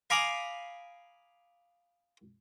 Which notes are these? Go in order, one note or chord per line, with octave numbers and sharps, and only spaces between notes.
F5 G#5 A#5 B5 D6 D#6